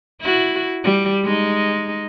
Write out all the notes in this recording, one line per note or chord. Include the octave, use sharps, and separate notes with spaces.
E4 F#4
G3
G#3 D#4